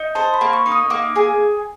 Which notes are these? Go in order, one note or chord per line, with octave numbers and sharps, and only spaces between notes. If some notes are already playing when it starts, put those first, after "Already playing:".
Already playing: D#4
C5 A5
B5
A#3
C#6
D#4
D#6
A#3 D6
G#4